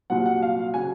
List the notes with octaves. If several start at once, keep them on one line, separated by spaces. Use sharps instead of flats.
C2 A#2 F#3 F#5
F#5
F5
C#3 F#3 G#5